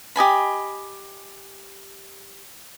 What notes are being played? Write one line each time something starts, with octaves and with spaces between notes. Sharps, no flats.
G4 D#5 G#5 B5